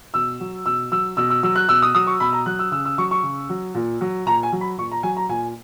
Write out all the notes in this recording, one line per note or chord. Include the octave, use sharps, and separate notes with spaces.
B2 E6
F#3
B2 E6
F#3 E6
B2 E6
E6
F#3 E6
F#6
B2 E6
D#6
F#3 D#6
C#6
B2 B5
A#5
F#3 F#6
E6
C#3 E6
E6
F#3 C#6
C#6
C#3
F#3
A#2
F#3
A#2 A#5
G#5
F#3
B5
A#2 C#6
A#5
F#3 G#5
A#5
A#2 G#5